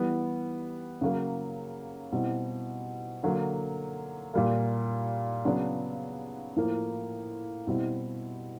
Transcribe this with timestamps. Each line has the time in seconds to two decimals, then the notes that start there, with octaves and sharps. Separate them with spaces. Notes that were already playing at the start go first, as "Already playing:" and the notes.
Already playing: E3 G3 B3
1.01 C#3 F#3 A#3
2.12 B2 G3 C4 E4
3.23 D3 F#3 A#3
4.34 A#2 G3 A#3
5.45 C#3 F#3 B3 D4
6.56 A2 F3 A#3
7.67 B2 G3 C4 E4